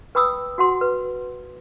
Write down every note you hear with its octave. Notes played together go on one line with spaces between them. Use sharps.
B4 G5 B5 D#6 E6
F#4 F#5 C6
B4